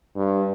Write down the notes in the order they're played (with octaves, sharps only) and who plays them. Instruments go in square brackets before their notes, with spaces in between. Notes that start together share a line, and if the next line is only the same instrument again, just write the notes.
[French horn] G2